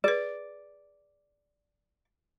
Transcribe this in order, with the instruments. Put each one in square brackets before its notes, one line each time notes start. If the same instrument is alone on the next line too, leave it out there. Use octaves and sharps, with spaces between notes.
[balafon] G#4 B4 [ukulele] D5